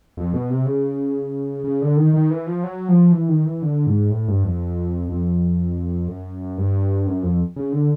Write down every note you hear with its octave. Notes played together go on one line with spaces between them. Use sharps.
F2
B2
C3
C#3
C#3
D3
D#3
D#3
E3
F3
F#3
F3
E3
D#3
E3
D3
G#2
A2
G2
F2
F2
F#2
G2
F#2
F2
C#3
D3